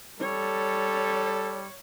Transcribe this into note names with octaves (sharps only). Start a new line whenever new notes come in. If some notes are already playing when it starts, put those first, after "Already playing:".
G3 A4 C#5